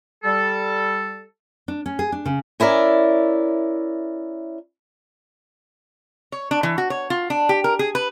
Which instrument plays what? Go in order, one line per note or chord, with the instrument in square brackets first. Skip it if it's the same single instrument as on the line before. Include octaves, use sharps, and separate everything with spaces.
[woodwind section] G3 A4
[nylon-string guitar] D4
C#4
G#4
D4
C#3
[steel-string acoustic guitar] C#4 E4 A#4 D5
[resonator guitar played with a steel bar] C#5
D4
E3
F#4
C#5
F4
D4
G4
A#4
G#4
B4